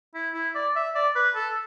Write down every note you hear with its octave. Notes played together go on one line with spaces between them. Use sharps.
E4
E4
D5
E5
D5
B4
A4